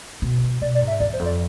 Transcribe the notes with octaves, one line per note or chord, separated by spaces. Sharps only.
B2
B2 D5
D5
G#2
E5
E2 D5
C5
F2
D5